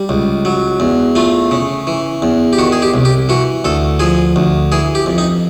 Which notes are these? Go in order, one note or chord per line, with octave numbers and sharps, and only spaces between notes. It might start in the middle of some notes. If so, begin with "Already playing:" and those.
Already playing: G3
C#2
F#3
E2
A3 F4
C#3
E3
E2
G4
D#3 F#4
G#4
G4
C2
G4
E3 F#4
D2 A4
F3 G#4
D2
E3 G#4
G4
F2
D#4